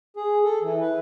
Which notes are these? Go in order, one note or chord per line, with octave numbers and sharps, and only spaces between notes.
G#4
A4
E3
B4